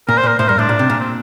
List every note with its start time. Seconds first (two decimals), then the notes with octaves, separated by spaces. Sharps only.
0.09 A#2 A#4
0.18 C5
0.23 A#2 A#4
0.39 A2 C5
0.49 G2 A#4
0.59 A2 D4
0.69 A#2
0.79 C3
0.90 A#2
1.00 C4